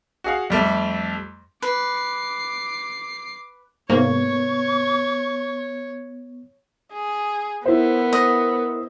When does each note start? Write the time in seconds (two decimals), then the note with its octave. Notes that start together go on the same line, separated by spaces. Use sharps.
0.24 F#4 G#4 F5
0.50 F2 G3 A3
1.62 B4 D6 C7
3.90 G#2 C3 A#3 B3 C#5 C#6
6.93 G#4
7.66 B3 E4 A#4 C5
8.13 D#5